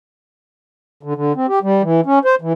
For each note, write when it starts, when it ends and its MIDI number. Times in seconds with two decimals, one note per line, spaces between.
1.03 1.14 50
1.15 1.33 50
1.36 1.46 60
1.48 1.59 67
1.63 1.82 55
1.83 2.01 52
2.06 2.19 61
2.25 2.35 72
2.42 2.53 52